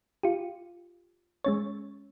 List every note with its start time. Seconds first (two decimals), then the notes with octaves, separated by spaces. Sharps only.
0.23 F4 G4
1.44 G#3 C#4 C#5